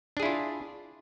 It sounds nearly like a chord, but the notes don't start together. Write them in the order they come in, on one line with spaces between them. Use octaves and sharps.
D4 G#4 E4 F4